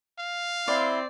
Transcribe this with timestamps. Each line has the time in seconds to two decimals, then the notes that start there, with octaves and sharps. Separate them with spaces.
0.19 F5
0.68 C4 E4 D5 C6